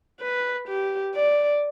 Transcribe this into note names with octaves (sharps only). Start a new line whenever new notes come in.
B4
G4
D5